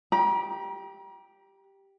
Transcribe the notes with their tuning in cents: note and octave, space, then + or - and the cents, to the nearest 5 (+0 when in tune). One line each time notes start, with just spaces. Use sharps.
G4 +0 A#5 +40